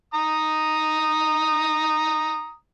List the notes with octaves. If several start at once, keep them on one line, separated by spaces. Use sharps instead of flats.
A#5 D#6